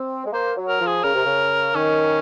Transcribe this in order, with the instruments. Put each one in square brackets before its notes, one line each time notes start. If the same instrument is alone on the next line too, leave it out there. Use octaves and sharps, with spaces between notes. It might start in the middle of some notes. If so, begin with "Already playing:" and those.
Already playing: [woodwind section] C4
G#3
[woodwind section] A#3 [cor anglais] C5
[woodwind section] F#3
[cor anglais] A#4
[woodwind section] F3
[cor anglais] G#4
[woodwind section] C#3 [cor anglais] A#4
[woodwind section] C3
C#3
[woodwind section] D#3 [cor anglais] C#4